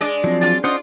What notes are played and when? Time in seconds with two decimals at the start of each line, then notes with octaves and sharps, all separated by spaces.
0.01 G#3 D4 D5
0.24 F3 F#3 C4
0.41 D4 F4 A6
0.64 C#4 D4 F4 C5 D#5 F#5 C6 D#6